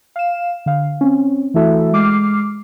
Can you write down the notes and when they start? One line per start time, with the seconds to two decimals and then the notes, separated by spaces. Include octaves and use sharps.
0.16 F5 E7
0.66 D3 F5
1.01 C4 C#4
1.54 E3 A3 E4 F#4 A4 E5
1.93 G#3 D6 F6 C7